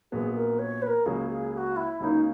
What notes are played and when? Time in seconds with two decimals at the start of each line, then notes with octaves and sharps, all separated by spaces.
0.12 A#1 A#2 F#3 B3 G#4
0.35 A#4
0.59 C#5
0.82 B4
0.87 A#4
1.06 C#2 C#3 F#3 A#3 C#4 G#4
1.29 G#4
1.53 G#4
1.57 F#4
1.76 E4
1.99 C#2 C#3 F#3 A#3 C#4 D#4 E4